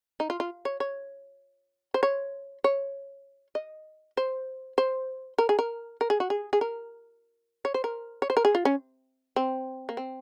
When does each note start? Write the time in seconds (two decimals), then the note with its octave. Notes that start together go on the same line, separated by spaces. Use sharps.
0.20 D#4
0.30 F4
0.40 F4
0.65 C#5
0.80 C#5
1.94 C5
2.03 C#5
2.64 C#5
3.55 D#5
4.17 C5
4.78 C5
5.38 A#4
5.49 G#4
5.59 A#4
6.01 A#4
6.10 G#4
6.20 F#4
6.30 G#4
6.53 G#4
6.61 A#4
7.65 C#5
7.74 C5
7.84 A#4
8.22 C#5
8.30 C5
8.37 A#4
8.45 G#4
8.55 F4
8.65 C#4
9.36 C4
9.89 A#3
9.97 C4